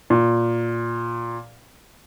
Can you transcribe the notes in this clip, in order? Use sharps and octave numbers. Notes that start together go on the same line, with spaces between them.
A#2